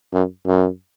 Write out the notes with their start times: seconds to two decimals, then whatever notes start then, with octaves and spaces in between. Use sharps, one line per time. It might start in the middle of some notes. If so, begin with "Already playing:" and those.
0.13 F#2
0.46 F#2